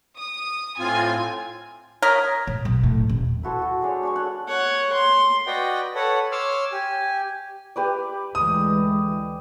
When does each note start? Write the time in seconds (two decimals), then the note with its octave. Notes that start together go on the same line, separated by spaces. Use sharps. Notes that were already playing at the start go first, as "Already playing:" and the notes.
0.17 D#6
0.79 A2 C4 F4 G#5
2.02 A#4 C#5 D#6 B6
2.47 A#2
2.65 B1
2.84 A2
3.10 D#1
3.43 E4 F#4 A4 C5
3.59 F#4 G5
3.82 G#3 D4 C#5
4.03 D4 C#5 C#6
4.16 A4 C#5 F#5
4.48 C#5 F#5
4.93 C6
5.46 F#4 B4 D5 D#5 F#5 G5
5.95 A4 B4 C#5 F#5
6.32 C#5 C6 D6 E6 F6
6.72 G4 G#5
7.76 G4 B4 D5
8.35 D2 E3 G#3 D#6